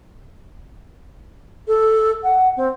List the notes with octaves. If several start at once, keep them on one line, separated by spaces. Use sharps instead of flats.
A4
F#5
C4